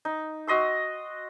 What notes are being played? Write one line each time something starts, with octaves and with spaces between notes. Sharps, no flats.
D#4
F#4 D#5 C6 E6